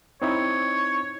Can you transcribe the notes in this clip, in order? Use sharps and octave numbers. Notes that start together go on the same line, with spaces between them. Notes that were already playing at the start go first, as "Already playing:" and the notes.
C4 D#4 E4 C#5